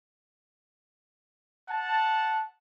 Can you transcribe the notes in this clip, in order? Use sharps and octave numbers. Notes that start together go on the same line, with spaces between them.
F#5 A5